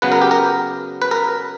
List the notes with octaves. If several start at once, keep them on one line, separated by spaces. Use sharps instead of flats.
C#3 F#3 B3 B4
A#4
G4
A#4
B4
A#4